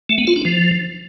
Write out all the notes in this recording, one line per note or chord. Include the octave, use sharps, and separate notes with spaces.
A3
B3
F4
D4
F3